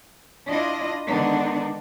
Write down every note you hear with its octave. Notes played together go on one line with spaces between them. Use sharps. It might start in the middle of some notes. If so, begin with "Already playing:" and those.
D4 E4 F4 D#5
D3 D#3 G#3 B3 D4 D#4